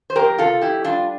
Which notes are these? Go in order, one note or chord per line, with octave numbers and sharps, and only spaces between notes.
C5
F2 G4 A#4
C3 F4 A4
F2 E4 G4
G3 D4 F4